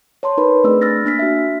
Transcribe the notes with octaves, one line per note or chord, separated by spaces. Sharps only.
C#5 A5 C6
D#4 A#4 B4 B5
A3 C4 D4 G#4 D5 E6
B5 E6 F6 A6 A#6
A#3 D4 F6 B6
F#4 E5